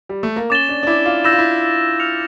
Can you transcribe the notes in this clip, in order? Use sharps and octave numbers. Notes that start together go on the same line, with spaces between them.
G3
A3
A#3
C#4 D6 A6 E7 G7
D4
D4
E4
F4
E4 E6 G6 A#6 E7
F4
E4
F6 C#7 F7